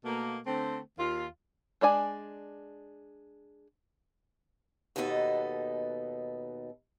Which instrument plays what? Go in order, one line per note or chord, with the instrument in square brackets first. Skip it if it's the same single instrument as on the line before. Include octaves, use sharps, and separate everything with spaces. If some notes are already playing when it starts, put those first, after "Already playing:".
[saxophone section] B2 A3 A#3
D3 A3 C4
D#2 F4
[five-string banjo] G#3 D4 D5 G#5
[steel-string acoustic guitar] D#2 B2 B3 D#4 F4 A4